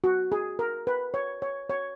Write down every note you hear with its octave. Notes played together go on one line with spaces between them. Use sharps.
F#4
G#4
A#4
B4
C#5
C#5
C#5